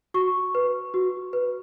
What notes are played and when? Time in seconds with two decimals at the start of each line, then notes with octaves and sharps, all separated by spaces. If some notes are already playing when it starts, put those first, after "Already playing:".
0.14 F#4 C#6
0.55 B4
0.94 F#4
1.33 B4